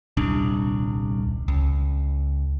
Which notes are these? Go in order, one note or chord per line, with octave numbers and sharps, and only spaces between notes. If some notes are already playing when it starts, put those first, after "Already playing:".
D#1 C2 D4
C#2